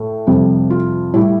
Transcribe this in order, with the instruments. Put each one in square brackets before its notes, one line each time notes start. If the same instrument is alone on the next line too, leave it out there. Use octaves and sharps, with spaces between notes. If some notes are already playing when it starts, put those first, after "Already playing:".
Already playing: [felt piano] A2 A4
F2 C3 G3
F4
A2 G3 E4